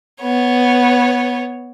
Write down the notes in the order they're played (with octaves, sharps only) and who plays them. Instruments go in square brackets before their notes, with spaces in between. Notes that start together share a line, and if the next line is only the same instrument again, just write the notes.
[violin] B3 C#5